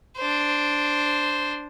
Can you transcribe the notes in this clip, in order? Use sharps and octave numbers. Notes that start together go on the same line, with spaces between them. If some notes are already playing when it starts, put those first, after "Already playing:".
D4 C5